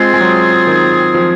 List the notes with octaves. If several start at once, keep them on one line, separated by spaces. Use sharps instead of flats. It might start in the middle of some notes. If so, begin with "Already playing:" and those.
Already playing: G#3 C4 F4 G#4
G#3
F#3
D#3
F3